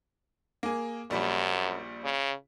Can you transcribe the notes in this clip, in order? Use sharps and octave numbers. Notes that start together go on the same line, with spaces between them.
A#3 G#4
A#1 F#2 G3
C#3